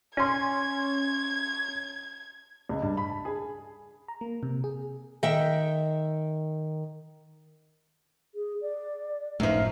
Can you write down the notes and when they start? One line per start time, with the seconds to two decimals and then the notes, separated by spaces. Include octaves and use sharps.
0.17 C#4 C#5 C6 G#6
2.69 C#2
2.82 G2
2.97 B5
3.10 A5
3.25 G#4
4.08 A#5
4.21 A#3
4.43 C3
4.64 G#4
5.23 D#3 E5 G5
8.35 G#4
8.62 D5
9.40 G1 F#2 A2 F3 A3 D#4